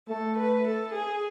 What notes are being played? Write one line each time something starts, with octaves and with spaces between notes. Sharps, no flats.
A3 A4
B4
A4
G#4